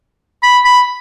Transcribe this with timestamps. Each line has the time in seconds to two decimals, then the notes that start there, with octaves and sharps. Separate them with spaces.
0.43 B5
0.65 B5